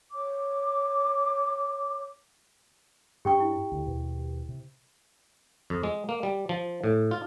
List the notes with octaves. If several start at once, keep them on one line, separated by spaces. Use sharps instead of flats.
C#5 D6
G2 C#4 D4 G4 G5 C#6
E4
D2
D#2 B2
C3
F2
G#3
A#3
G3
F3
A2
F4